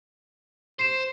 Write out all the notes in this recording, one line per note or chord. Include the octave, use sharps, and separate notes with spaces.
C5 C7 E7